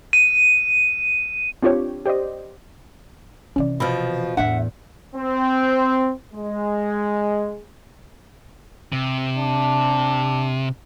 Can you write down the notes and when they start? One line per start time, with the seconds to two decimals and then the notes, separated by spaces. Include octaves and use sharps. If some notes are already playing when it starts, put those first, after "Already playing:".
0.13 D#7
1.63 C4 D4 F4 G4 C#5
2.06 G4 C5 D5 D#5
3.56 C3 E3 C#4 D5
3.80 B2 F3 B5 E6 F6
4.37 E2 A2 D4 E5 F#5
5.16 C4
6.34 G#3
8.93 C3
9.37 D4